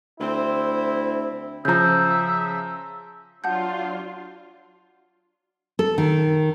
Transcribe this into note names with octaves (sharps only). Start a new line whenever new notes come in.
D2 C4 E4 C5
C#3 F3 E5 A#5 G6
F#3 D4 F4 F#5 A5 G6
A4
D#3